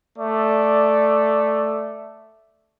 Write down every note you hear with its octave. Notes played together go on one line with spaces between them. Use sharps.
A3 D5